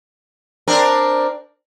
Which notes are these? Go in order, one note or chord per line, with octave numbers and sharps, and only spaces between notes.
C4 D4 A#4